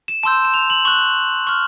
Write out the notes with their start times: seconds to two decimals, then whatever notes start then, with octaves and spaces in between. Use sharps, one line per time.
0.08 E7
0.23 A5 C6 E6 G6 E7
0.45 E7
0.54 F7
0.70 F#7
0.85 C#6 F#6 F#7
1.47 C#6 F6